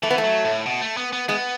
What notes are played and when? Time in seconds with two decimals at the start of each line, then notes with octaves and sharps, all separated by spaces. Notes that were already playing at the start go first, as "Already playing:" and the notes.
0.03 E3 A3
0.11 B3
0.18 A3
0.24 F#3
0.45 A2
0.66 B2
0.81 A3
0.97 B3
1.13 B3
1.28 G#3 B3